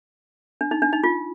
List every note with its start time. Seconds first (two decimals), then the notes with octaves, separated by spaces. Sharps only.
0.61 D4
0.71 D#4
0.82 D4
0.93 D#4
1.04 F4